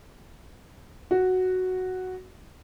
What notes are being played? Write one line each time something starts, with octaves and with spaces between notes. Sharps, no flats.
F#4